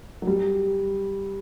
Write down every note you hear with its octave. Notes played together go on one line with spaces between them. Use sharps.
F#3
G3